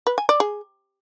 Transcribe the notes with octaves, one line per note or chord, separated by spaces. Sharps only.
B4
G#5
D5
G#4